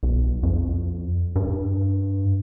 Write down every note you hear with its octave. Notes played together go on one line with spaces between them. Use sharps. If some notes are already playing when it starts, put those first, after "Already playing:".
B1
F2
G2